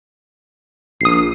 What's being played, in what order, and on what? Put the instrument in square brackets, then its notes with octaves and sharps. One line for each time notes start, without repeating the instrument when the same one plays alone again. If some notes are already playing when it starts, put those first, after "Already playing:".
[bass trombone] A#1 [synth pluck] D#6 C7